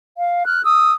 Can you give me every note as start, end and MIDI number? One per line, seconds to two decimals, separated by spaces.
0.18 0.46 77
0.46 0.62 89
0.46 0.62 90
0.64 0.93 87
0.64 0.93 88